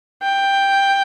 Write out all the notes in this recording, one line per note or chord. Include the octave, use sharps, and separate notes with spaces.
G5